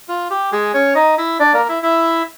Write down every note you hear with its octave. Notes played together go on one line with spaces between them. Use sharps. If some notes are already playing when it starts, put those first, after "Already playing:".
F4
G4
G#3 G#4
C#4 C#5
D#4 D#5
E4 E5
D4 D5
A#3 A#4
E4 E5
E4 E5